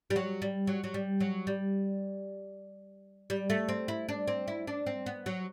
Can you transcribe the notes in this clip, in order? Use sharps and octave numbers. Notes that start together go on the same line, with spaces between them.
G3
F#3
G3
F#3
F#3
G3
F#3
G3
G3
A3
C4
E4
D4
C4
E4
D4
C4
B3
F#3